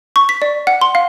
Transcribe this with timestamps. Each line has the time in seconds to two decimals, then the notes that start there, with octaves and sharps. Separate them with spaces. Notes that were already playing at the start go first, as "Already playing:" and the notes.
0.16 C#6
0.29 B6
0.42 D5
0.67 F#5
0.81 C6
0.95 F5